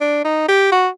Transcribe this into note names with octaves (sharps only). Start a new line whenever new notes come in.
D4
D#4
G4
F#4